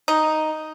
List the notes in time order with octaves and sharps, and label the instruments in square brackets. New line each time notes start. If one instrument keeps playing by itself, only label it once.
[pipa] D#4